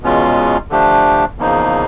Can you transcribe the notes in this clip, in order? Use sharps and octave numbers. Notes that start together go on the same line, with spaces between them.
E2 B2 G#3 C#4 F4
D3 F3 A3 D4 G4
E2 C#3 F3 A#3 D#4